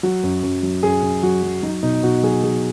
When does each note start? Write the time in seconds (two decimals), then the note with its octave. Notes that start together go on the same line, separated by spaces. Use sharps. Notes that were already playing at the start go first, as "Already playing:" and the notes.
0.03 F#3 F#4
0.23 F#2
0.43 F#2
0.63 F#3
0.83 F#2 G#4
1.03 F#2
1.23 F#3 F#4
1.43 F#3
1.63 F#3 D#4
1.83 B2 D#4
2.03 B2 F#4
2.23 F#3 G#4
2.43 F#3 G#4